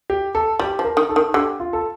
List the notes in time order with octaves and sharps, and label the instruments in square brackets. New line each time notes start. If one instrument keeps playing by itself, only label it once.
[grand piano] G4
A4
[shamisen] G3 [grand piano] G4
[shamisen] F3
[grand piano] A#4
[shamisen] D#3
[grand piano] A4
[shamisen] D#3
[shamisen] D3 [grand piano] G4
[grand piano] F4
A4